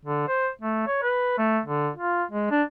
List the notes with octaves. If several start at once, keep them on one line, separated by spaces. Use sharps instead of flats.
D3
C5
A3
C#5
B4
A3
D3
F4
G#3
D4